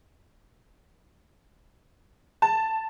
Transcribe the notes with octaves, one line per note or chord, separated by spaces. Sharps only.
A5